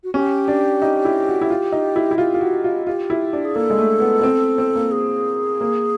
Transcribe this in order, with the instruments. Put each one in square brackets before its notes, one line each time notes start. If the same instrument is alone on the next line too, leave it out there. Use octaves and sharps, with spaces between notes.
[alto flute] F#4
[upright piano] C#4 [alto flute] G4
[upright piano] D4
D#4
E4
F#4
E4
F4
D#4
E4
E4
[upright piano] F4 [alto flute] G4
[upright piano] F4
F#4
F4
[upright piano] F4 [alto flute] G4
[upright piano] E4
D4
[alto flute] G#4
[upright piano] A#3 [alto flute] A4
[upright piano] G#3
A3
B3
B3
C4
C4
A#3
[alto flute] G#4
[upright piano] A#3